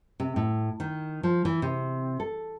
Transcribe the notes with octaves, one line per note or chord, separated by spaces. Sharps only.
C3
A2
D#3
F3
E3
C3
A4